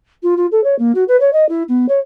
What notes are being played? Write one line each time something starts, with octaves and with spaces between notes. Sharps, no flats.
F4
F4
A4
C#5
A#3
F#4
B4
C#5
D#5
E4
B3
C#5